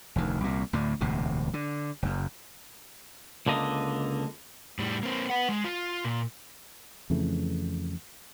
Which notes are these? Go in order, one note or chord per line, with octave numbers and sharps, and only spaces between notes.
F1 D2 D#3
C2 A#2
D2 A2 D3
E1 D2 A2 C3
D3
F#1 F#2
C#2 D3 A#3 D#5
A2 G3
A#3 C4
B4 F#5
G#3
F4
A#2
F2 C#3 E3 A3